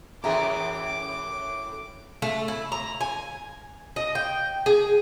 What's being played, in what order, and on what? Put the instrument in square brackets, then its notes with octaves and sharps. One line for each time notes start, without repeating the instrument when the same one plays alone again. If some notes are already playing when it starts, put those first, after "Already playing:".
[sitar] F#2 A2 E3 [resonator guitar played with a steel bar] G#4 E5 A#5 [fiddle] D6
[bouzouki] A3
E4
A#5
G#5
D#5
G5
G#4